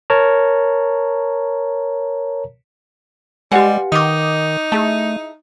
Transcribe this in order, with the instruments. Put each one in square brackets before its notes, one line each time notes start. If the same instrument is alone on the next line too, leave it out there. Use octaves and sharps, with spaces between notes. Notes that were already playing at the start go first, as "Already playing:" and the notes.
[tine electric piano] A#4 C#5 A5 A#5
[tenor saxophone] G3 [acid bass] G#3 [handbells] G4 G#5 [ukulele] B4 F5 F#5
[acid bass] D#3 [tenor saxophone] D#4 [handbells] D6 D#6
[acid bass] A3 [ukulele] E4 G#4 A5